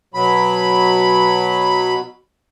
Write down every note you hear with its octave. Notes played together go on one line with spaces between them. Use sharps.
B2 F#3 B5